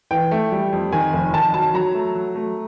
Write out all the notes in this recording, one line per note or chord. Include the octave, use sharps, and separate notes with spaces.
E3 G5
A3
G3
F2
D#3 G#5
F1
D#3 A5
F#3 A5
F#3 A#5
A3
F#3
A3